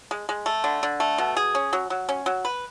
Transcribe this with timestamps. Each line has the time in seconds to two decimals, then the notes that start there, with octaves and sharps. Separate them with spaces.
0.11 G#3
0.29 G#3
0.46 A3
0.64 D3
0.83 D3
1.00 A3
1.18 B2
1.37 G#4
1.55 C#4
1.73 F#3
1.90 F#3
2.09 C#4
2.26 F#3
2.45 B4